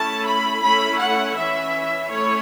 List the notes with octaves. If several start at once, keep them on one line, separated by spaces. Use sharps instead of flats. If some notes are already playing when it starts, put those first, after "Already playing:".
Already playing: A3 C#4 E4 A5
B5
A3 C#4 E4 B5
F#5
E3 C#4 E4 E5
A3 C#4 E4 C#5